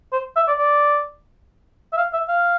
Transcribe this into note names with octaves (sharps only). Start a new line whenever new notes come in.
C5
E5
D5
D5
E5
F5
E5
F5